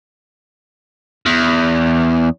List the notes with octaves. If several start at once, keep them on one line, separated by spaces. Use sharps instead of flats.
E2